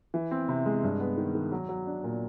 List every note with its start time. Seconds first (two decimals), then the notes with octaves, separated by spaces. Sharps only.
0.14 E3
0.31 C4
0.49 C3
0.66 G#3
0.84 G2
1.00 B3
1.17 D#3
1.35 D#3
1.52 F#3
1.69 F#3
1.87 D4
2.04 A#2